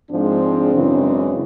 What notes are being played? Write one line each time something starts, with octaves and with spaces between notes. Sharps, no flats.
G#2 F3 G#3 C4 D4
F#2 C#3 E3 G#3